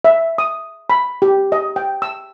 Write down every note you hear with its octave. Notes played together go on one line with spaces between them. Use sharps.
E5
D#6
B5
G4
D#5
G5
E6